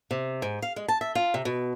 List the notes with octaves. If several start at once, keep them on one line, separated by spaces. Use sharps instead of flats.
C3
G#2
F5
G#3
A5
E5
F4
C3
B2